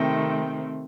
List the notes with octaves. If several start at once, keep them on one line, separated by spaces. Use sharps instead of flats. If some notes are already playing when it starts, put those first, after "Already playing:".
Already playing: C3 D#3 A3 C4 G5